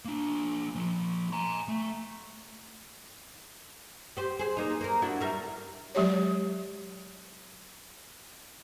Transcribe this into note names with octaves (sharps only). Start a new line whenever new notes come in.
A#3 D4
F3 A#3
G#5 A#5
A3
G4 C5
G#4 C5
A#3 D#4
A#3 A#4
D4 E4 F#4
G3 A#4 E5
F#3 G#3 G4 C#5